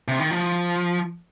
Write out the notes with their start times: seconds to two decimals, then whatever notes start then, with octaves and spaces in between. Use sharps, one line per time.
0.08 C3
0.19 D#3
0.31 F3